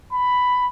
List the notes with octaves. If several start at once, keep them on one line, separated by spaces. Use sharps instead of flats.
B5